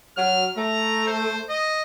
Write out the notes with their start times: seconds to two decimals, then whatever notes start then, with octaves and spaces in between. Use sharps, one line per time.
0.17 F#3 F6
0.57 A3 A#5
1.07 C5
1.49 D#5